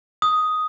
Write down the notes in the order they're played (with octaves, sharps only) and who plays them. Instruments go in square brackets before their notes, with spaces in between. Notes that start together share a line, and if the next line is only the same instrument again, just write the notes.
[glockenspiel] D#6